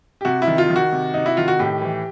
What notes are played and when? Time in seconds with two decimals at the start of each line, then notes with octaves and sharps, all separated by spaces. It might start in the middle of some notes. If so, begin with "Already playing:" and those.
0.21 G4
0.25 C3 F#4
0.42 E4
0.47 D#3
0.58 F4
0.70 D#3
0.76 F#4
0.92 C3
1.14 C3 D#4
1.26 E4
1.37 D#3 F4
1.48 F#4
1.59 A2 G4
1.82 E3